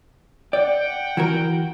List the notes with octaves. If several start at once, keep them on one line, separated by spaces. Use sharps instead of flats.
D5 F#5 G5
E3 F#4 A#4